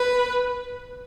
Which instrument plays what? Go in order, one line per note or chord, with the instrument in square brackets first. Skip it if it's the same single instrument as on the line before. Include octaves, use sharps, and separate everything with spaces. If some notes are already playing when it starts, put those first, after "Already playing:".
Already playing: [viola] B4